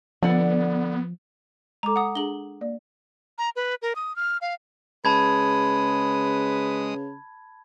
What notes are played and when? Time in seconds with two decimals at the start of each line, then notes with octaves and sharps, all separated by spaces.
0.23 D3 F3 B3 D5 F#5
1.83 G#3 A4 A#5 D6
1.96 F#5 D#6
2.15 D4 G#4 F#7 G7
2.61 A#3 D5
3.38 A#5
3.56 B4
3.82 A#4
3.96 D#6
4.16 F6
4.41 F5
5.05 C#3 G#3 B4 A5 B5 D#6 G#6